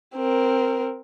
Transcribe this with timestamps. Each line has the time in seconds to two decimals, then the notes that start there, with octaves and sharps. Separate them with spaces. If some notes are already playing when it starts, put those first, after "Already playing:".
0.16 C4 A#4